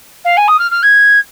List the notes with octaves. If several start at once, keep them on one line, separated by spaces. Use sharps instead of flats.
F5
G#5
D#6
F6
F6
G#6